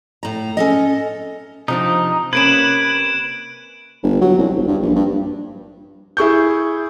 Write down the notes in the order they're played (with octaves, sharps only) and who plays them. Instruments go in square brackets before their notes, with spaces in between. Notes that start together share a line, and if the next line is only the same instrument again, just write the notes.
[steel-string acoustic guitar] A2 A#5
C#4 A4 D#5
[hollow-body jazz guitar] C3 F3 D4 [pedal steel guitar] D#4
[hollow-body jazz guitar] C3 A#3 C#4 [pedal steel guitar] B4 [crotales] G#6 D7 E7
[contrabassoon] G1
F#3
C2
G1
G2
A#1
G2
[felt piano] E4 G#4 C#6 G6